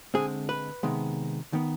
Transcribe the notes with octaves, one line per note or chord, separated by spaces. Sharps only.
D3 G#3 C4 G#4
B4
C3 D#3 G#3 B3
D#3 B3